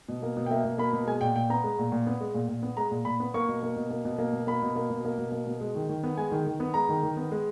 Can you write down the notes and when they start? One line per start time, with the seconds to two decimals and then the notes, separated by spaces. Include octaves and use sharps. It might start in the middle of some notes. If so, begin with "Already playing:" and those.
0.09 B2
0.22 A#3
0.37 B2
0.46 G5
0.50 A#3 E5
0.64 B2
0.78 A#3 B5
0.93 B2
1.07 G#3 G#5
1.21 A#2 G5
1.36 A#2 G5
1.50 B3 A#5
1.64 G#3
1.79 A#2
1.92 A#2
2.07 B3
2.21 G#3
2.34 A#2
2.48 A#2
2.63 B3
2.77 G#3 A#5
2.91 A#2
3.05 A#2 B5
3.20 B3
3.34 A#3 C#6
3.48 B2
3.63 A#3
3.76 B2
3.90 A#3
4.05 B2
4.18 A#3
4.33 B2
4.47 A#3 B5
4.62 B2
4.76 A#3
4.90 B2
5.05 A#3
5.18 B2
5.32 A#3
5.47 B2
5.61 G#3
5.75 D#3
5.89 D#3
6.04 B3
6.17 G#3 G#5
6.31 D#3
6.46 D#3
6.60 B3
6.74 G#3 A#5
6.89 D#3
7.03 D#3
7.17 B3
7.31 G#3